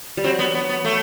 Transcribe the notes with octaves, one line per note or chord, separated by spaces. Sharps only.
G3
F#3 C4
B3
B3
B3
A3